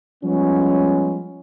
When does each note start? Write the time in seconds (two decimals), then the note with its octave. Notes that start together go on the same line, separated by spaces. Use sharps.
0.24 F3 G3 G#3 B3 C#4